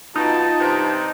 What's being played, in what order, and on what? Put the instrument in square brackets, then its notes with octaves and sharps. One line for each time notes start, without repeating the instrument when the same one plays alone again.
[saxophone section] B2 [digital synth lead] D#4 [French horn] F4 [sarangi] A5
[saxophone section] G2 C3